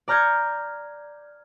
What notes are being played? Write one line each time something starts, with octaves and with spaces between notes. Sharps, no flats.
D5 A#5 F6 G6 G#6 C#7